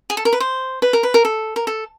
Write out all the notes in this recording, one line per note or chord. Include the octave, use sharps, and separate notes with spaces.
G#4
A4
A#4
B4
C5
B4
A#4
B4
A#4
A4
A#4
A4